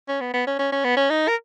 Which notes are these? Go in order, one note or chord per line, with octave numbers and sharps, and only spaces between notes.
C#4
B3
B3
C#4
C#4
C#4
B3
C#4
D#4
A#4